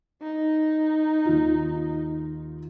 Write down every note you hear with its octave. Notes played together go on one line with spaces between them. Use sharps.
D#4
D#2 F4